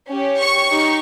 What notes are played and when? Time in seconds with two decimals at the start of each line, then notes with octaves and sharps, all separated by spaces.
0.10 C#4 G4
0.40 C#6
0.71 D#4 G4